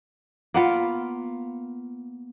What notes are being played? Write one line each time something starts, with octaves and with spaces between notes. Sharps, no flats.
A#3 B3 F4